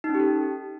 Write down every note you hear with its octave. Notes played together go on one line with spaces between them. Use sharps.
D#4
C#4
G4
A4